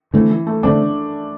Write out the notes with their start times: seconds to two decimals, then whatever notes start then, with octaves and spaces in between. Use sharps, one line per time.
0.13 D3 E3 A3 C4
0.30 E3
0.47 A3
0.63 D3 A3 C4 D4